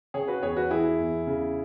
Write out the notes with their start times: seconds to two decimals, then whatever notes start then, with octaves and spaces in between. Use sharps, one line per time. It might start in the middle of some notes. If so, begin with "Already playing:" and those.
0.14 C#3 G#4 C#5
0.28 F#4 B4
0.42 E2 G#4 C#5
0.57 F#4 B4
0.71 E3 E4 G#4
0.99 E2
1.27 C#3